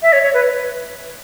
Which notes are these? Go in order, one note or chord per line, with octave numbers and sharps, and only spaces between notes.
E5
C#5
C#5
B4